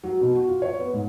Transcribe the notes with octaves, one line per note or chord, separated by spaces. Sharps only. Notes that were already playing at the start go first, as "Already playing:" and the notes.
F#3
B2
F#4
F4
C#5
B3
G#2